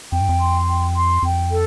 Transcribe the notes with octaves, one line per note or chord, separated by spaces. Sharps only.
F2 G5
G2
F2
C6
G5
C6
F2 G5
A4